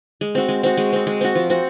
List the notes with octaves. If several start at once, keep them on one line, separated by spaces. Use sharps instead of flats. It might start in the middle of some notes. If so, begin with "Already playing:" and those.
G#3
C4 F#4
G#3
C4 F#4
G#3
C4 F#4
G#3
C4 F#4
F3
C4 F#4